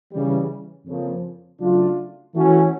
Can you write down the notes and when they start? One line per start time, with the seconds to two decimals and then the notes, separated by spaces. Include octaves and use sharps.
0.12 C#3 E3 G3
0.86 F2 C#3 F3 A#3
1.61 C#3 F#3 A3 D4 F4
2.35 E3 A3 C#4 F#4